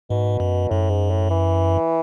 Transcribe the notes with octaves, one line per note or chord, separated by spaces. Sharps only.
G#2 B2
F#2
F#2 A2
G#2
A2
E3